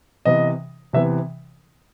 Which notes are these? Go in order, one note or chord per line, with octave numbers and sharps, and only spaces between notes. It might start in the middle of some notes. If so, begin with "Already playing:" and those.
C3 E3 B3 D#5
C3 E3 B3 E5